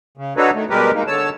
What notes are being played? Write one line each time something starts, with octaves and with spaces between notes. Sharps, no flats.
C#3
D4 D#4 F#4 A4 B4 C#5
D#3 A3
B2 G3 G#3 G4 A#4 B4
G#3 A#3 D#4
D3 C#5 A5 E6